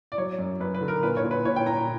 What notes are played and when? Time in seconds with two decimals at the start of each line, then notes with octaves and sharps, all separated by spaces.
0.12 D5
0.18 F#3 C#5
0.39 F#2
0.60 F#2 B4
0.74 B4
0.81 D3
0.88 A#4
1.02 A#2 B4
1.17 C#5
1.24 A#2
1.31 B4
1.45 A#2 C#5
1.56 G5
1.66 A#2 A#5